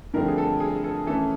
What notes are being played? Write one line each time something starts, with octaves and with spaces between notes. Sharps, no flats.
G2 D3 F3 A3 C4 A#4
G#4
A4
G#4
A4
E3 A3 C#4 A4